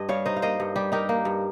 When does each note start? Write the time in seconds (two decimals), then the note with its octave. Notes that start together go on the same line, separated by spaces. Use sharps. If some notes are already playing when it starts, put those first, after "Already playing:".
Already playing: G2 D#5
0.09 G3 C#5 F5
0.25 D#4 C5 D#5
0.37 F5
0.42 A#3 C5 D#5
0.60 G2
0.76 G3 G4
0.92 D#4 G4 A#4
1.09 A#3
1.25 G2